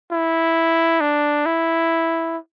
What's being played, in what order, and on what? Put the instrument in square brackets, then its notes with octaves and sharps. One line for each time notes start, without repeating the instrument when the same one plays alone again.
[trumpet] E4
D4
E4